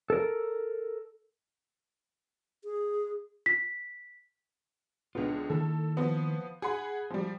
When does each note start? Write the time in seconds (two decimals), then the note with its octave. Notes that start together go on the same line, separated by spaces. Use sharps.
0.10 A4 A#4
2.64 G#4
3.46 B6
5.15 C#2 D3 B3 F4
5.50 D#3 A#3 E4 A4
5.97 F3 B3
6.62 G#4 F#5 G#5 B5
7.10 F3 G3